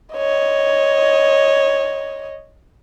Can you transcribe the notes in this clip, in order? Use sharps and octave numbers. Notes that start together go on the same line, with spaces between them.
C#5 D#5